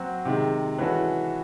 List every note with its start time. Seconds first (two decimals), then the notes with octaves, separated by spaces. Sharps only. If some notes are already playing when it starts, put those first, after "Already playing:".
Already playing: F#3 C4 F#4
0.25 C3 D#3 G#3
0.79 E3 G#3 C#4 F#4 A4